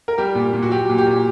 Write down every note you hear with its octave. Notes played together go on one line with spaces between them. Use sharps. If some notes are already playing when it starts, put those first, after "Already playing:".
A#4
G3 G4
A#2
A#2
F#4
F#3 G4
A#2
G4
A#2